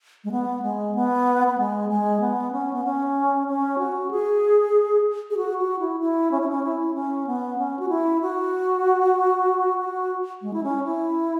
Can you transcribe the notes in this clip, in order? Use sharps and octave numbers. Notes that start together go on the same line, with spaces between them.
G#3
B3
G#3
B3
B3
G#3
G#3
B3
C#4
B3
C#4
C#4
F#4
G#4
G#4
F#4
F#4
E4
E4
C#4
E4
C#4
E4
C#4
B3
C#4
F#4
E4
F#4
F#4
G#3
E4
C#4
E4